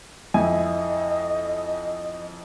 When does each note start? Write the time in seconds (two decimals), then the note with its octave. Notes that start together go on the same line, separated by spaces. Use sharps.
0.34 F2 E4 D#5 G#5